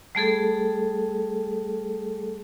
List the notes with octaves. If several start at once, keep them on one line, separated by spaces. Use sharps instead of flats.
G3 A3 G#4 A4